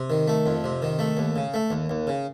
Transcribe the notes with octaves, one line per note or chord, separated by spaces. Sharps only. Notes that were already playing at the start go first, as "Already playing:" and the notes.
Already playing: C3
D#3
A3
F2
C3
D#3
A3
D#2
C#3
A3
D#2
D#2
C#3